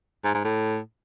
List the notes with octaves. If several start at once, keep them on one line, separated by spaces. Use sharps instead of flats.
G#2
G#2
A2